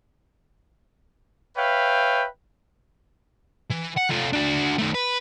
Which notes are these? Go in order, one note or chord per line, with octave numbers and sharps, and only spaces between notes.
B4 C#5 E5 F5 G5
E3
F#5
A3 F4
D4 F#4
D#3 A3
B4